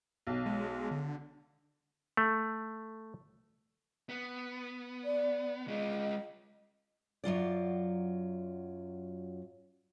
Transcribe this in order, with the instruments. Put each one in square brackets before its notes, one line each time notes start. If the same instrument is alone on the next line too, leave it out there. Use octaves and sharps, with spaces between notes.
[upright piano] B1
[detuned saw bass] G#3
D3
[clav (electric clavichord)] A3
[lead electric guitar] B3
[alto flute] D5
[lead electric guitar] G#3 F4 [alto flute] D#5
[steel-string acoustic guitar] F#2 F#3 F4 D5